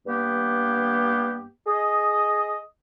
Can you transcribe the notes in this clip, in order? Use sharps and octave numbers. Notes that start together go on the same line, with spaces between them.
G2 A#3 B3 G4
G#4 D#5